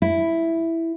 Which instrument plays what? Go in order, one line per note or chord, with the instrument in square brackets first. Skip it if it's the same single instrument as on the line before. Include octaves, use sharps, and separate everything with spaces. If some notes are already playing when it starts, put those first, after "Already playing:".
[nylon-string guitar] E4